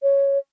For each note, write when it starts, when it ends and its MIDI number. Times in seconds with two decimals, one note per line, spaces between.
0.03 0.38 73